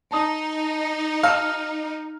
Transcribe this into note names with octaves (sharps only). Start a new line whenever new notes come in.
D#4 A5 D#6
F#4 A4 F5 F6